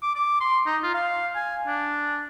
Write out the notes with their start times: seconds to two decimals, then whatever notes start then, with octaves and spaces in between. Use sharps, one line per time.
0.02 D6
0.15 D6
0.41 C6
0.66 D#4
0.83 F4
0.94 F5
1.35 G#5
1.67 D4